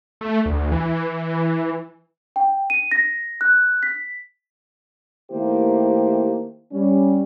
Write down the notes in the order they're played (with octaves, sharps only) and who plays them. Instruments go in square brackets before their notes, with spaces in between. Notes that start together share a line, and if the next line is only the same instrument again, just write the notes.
[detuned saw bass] A3
D2
E3
[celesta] G5
D#7
A#6
F#6
B6
[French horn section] D#3 A3 A#3 E4 G4 C5
G3 C#4